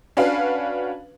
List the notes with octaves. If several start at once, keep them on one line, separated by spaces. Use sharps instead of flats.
C#4 D4 F#4 B4 F5